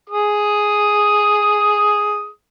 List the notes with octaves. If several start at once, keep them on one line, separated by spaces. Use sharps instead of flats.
G#4 D#6